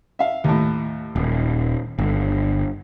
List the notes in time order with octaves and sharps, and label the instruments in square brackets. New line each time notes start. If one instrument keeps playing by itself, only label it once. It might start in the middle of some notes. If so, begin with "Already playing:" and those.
[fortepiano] E5 F5
D#2 A2
[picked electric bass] D#1
G1